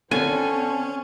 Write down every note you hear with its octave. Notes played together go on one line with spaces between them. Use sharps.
D3 C4 C#4 G#5